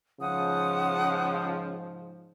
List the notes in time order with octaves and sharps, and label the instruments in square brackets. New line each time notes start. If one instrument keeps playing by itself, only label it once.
[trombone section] G#2 F3 [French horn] C#3 [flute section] F#5 D#6